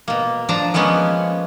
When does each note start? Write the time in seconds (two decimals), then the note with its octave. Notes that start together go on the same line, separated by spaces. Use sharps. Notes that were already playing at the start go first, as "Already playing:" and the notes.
0.08 B2 A#3
0.49 F3 D4 A5 A#5
0.74 F3 G#3 A#3 B3 C#4